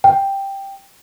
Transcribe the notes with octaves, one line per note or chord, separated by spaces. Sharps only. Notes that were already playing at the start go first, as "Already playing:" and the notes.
G5